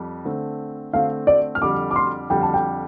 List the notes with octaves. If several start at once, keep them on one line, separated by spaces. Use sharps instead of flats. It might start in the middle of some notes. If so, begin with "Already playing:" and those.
Already playing: F2 G3
D3 A3 C4
D3 A3 C4 F5
D5
F6
F2 D3 G3 D6
D6
C6
F2 D3 G3 G5
A5
G5